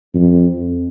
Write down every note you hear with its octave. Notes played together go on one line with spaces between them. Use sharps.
F2